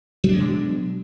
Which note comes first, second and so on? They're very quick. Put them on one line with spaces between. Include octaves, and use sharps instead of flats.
F#3 D4 G#3 B2